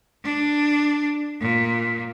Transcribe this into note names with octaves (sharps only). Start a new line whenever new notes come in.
D4
A#2